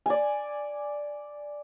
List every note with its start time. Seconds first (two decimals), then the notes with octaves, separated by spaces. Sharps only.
0.06 D5 G#5